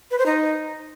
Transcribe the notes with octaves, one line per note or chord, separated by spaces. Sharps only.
B4
C5
D#4